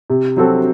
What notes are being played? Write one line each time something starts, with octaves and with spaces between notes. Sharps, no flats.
C3
F#3 C4 F#4 A4